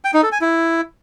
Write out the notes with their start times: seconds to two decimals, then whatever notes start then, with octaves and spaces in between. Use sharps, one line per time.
0.05 G5
0.14 D#4
0.23 A4
0.32 G#5
0.41 E4